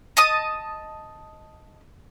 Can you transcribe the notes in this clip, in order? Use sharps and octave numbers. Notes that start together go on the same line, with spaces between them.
D#5 A5 D#6